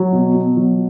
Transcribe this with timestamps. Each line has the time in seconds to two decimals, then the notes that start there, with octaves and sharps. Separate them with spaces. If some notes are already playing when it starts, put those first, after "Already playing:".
Already playing: F#3
0.13 B2
0.34 B2
0.57 F#3